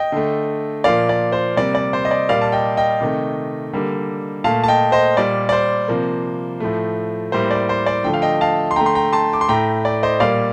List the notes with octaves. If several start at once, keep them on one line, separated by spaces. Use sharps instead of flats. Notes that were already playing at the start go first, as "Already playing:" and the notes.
Already playing: D#5 G5
D3 A3
A#2 F3 A#3 D5 F5
D5
C5
C3 G3 A#3 D5
D5
C5
D#5
D5
A#2 G3 A#3 D5 F5
A5
D#5 G5
D#5 G5
C3 D#3 A3
D3 G3 A#3
A#2 A3 F5 A5
A5
D#5 G5
C5 D#5
A#2 G3 A#3 D5
D5
C5
C3 F3 A#3
A2 F3 A3
A2 G3 A#3 C5
D5
C5
D5
D3 F3 A3 G5
F5
D#5 G5
F5 A5
C6
D3 A3 G5 A#5
C6
G5 A#5
A5 C6
D6
C6
A2 A3 G5 A#5
D5
C5 D#5
A#2 G3 A#3 D5 F5